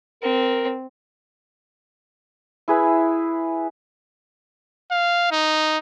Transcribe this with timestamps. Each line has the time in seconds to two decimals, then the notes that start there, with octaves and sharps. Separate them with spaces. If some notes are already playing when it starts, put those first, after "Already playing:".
0.23 C4 A#4
2.68 E4 G#4 B4 E5
4.91 F5
5.31 D#4